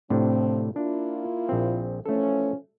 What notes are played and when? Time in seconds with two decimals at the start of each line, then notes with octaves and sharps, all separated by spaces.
0.10 A2 C3 F3 C4 D4
0.76 A#3 D4 E4 F4
1.49 A#1 C4
2.06 E3 F3 A3 C#4 A4